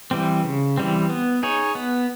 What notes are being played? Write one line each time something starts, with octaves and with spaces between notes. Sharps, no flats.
E3 G3 C4
C#3
E3 G3 C4
B3
D#4 G#4 C#5
B3